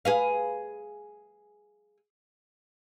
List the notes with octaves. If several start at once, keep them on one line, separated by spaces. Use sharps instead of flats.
G#4 B4 F5